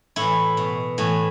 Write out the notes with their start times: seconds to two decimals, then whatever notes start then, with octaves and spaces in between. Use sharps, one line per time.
0.16 A2 E3 E4
0.57 B2
0.98 A2 E3